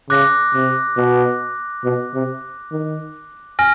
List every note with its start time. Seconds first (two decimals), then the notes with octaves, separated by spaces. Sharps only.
0.10 C#3 D6 F#6 A#6
0.55 C3
0.97 B2
1.85 B2
2.14 C3
2.72 D#3
3.59 G#5 F6 A#6